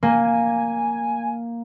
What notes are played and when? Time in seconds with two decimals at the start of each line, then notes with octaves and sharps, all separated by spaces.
0.03 A#3 G#5